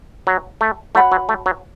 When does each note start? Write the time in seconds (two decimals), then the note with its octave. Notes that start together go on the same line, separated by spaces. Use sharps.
0.27 F#3
0.61 A3
0.95 A3 F#4 C#5 F#5 B5
1.12 F#3
1.29 A3
1.46 F#3